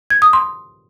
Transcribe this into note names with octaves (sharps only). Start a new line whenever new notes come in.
G#6
D#6
C6